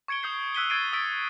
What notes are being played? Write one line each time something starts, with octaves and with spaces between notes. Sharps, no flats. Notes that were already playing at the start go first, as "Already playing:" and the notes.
C#6 G#6 C#7 D7 G7
D#6 G6 C7
E6 F#6 B6 D#7 G7
E6 G#6 A6 C7 D7 D#7
C#6 D#6 E6 A6 B6 D7